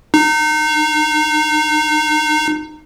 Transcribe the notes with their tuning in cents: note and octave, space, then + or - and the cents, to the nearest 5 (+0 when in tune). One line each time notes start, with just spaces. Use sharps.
D#4 -25